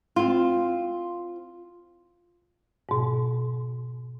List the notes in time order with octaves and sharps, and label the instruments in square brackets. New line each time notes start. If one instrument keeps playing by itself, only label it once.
[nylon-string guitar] C4 F4
[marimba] G#2 B2